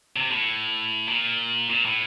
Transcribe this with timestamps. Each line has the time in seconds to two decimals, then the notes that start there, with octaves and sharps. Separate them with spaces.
0.16 C3
0.31 A2
1.08 A#2
1.70 A#2
1.85 A2